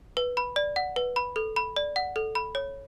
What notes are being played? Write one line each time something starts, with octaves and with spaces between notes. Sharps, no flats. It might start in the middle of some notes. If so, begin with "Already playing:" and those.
B4
B5
D5
F#5
B4
B5
A4
B5
D5
F#5
A4
B5
C#5